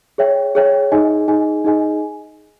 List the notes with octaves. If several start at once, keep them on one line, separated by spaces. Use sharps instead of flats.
G#4 C#5 E5 G5
G#4 C#5 E5 G5
D#4 G#4 D#5 G#5
D#4 G#4 D#5 G#5
D#4 G#4 D#5 G#5